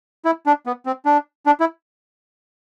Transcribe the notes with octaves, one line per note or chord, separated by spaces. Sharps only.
E4
D4
B3
C4
D4
D4
E4